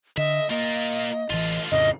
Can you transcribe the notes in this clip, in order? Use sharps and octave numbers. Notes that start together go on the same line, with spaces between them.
D3 D#5 E5
A#3 F4 A#4 D#5
A1 D3 E3 F4
F2 A2 C#3 D#5